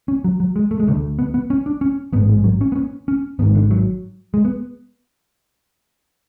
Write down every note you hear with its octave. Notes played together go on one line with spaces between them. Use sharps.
C#4
F#3
F#3
G#3
A3
G#3
D2 D3 A3
B3
B3
C#4
D4
C#4
A1 G#2 B3
G#3
F#3
C#4
B3
C#4
C#4
G#1 G#2 B3
D3
F#3
G#3
B3